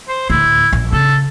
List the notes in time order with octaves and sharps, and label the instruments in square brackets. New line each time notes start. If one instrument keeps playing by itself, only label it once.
[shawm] C5
[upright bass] D2 A2 [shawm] E4
[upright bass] A#1
[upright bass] C#3 [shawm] A4